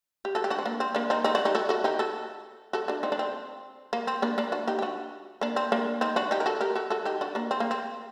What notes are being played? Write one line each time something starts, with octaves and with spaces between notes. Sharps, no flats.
G4
F#4 A4
G4
D4 F#4
C4
A#3 D4
C4
A#3 D4
C4 D#4
C4 D#4
D4 F#4
D#4 G4
F#4 A4
F#4 A4
D#4 G4
F#4 A4
F#4 A4
D4 F#4
C4 D#4
D4
C4
A#3
C4
A#3 D4
A#3 D4
D4 F#4
D#4 G4
G4
D4 F#4
A#3 D4
C4
A#3 D4
C4 D#4
D4 F#4
D#4 G4
A#4
F#4 A4
G4 A#4
F#4 A4
F#4 A4
D#4 G4
D4 F#4
A#3 D4
C4
A#3
C4